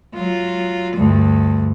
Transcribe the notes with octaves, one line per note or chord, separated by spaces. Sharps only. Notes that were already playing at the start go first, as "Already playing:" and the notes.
F#3 F4
D2 G2